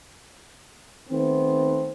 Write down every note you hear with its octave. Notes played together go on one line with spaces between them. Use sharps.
D#3 A3 B3 C4